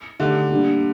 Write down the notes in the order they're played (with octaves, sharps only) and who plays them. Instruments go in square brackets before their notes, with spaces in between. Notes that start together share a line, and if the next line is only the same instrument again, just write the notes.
[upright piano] D3 [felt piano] D#3 A3 D4 G4
[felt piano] D3 G3 A#3